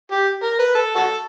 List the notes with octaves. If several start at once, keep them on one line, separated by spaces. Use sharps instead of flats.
G4
A#4
B4
A4
F#4 A4